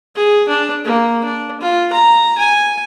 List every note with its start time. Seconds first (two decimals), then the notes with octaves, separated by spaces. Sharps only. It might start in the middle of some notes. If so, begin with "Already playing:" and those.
0.15 G#4
0.49 D4
0.85 A#3
1.24 D4
1.61 F4
1.93 A#5
2.38 G#5